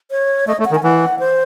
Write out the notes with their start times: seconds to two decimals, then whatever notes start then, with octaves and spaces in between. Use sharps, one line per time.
0.11 C#5
0.47 A3 D#5
0.59 A3
0.65 F#5
0.71 D#3
0.75 G#5
0.83 E3 F#5
1.19 C5